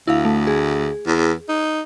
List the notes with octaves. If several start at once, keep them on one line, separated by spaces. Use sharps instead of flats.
D2 E4 F5
A3
G#4
E2
D#4